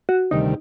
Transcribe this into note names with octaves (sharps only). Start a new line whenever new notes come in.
F#4
D2 C3 D#3 G3 D#4